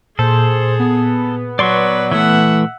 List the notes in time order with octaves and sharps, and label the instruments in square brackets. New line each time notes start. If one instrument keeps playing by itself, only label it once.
[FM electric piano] A#2 [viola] G#4 [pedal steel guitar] A4 [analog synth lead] C5
[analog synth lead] B3
[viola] F#3 B4 [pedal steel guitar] D5 C6 C#6
[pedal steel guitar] E3 A3 [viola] E5 F#5